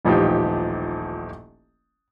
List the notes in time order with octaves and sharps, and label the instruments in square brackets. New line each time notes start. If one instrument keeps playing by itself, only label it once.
[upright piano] D#1 A1 F3 D#4 G4